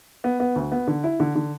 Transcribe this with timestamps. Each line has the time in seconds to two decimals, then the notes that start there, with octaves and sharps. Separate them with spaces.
0.24 B3
0.40 B3
0.56 D2
0.72 B3
0.87 D3
1.04 E4
1.20 D3
1.36 D3